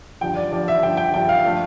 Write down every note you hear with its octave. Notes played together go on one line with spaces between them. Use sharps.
G2 D3 F3 G5
D5
G2 D3 F3 D5
E5
G2 D3 F3 G5
G5
G2 D3 F3 G5
F5
F3 A3 D4